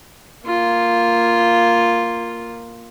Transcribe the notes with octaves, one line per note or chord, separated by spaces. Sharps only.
A#3 F4